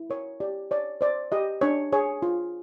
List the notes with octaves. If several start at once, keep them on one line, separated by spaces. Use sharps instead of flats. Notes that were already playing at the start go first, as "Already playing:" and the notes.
Already playing: E4
A#4 C#5
G4 D5
C#5 D5
C5 D5
G4 D#5
D4 C#5
G#4 C#5
F4